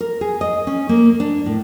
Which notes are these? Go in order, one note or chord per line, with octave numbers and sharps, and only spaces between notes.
A#4
G#4
D#5
C#4
A#3
D4
A2